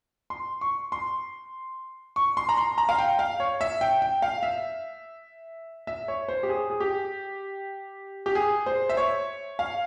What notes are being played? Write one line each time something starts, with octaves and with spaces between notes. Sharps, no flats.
C6
C#6
C6
C#6
C6
A#5
C6
A#5
F5
G5
F5
C#5
E5
G5
G5
F5
E5
E5
C#5
C5
G4
G#4
G#4
G4
G4
G#4
C5
E5
C#5
F5